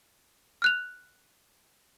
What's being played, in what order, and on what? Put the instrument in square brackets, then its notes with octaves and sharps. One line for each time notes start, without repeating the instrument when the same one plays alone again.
[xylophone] F6 F#6 F7